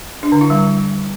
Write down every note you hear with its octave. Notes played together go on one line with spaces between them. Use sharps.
D4
D3
E4
G3